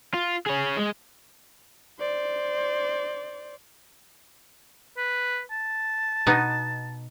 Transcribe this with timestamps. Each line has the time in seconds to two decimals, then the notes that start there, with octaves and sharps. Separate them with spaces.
0.14 F4
0.46 G#4 C#5
0.77 G#3
2.00 C5 D5
4.97 B4
5.51 A5
6.27 B2 B3 D#4